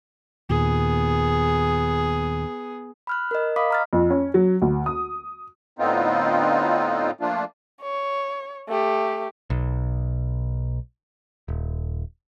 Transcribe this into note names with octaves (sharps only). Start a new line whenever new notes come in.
D#2 A#2 B3 G#4
B5 F6 F#6
A#4 D#5
D#5 F5 B5 D6 D#6 B6
A#5 F6 A6
F2
C#4
F#3
D2
D#6
A2 D3 B3 C4 D#4 F4
F3 A3 A#3 D4 F4
C#5
A3 G4
B1
D#1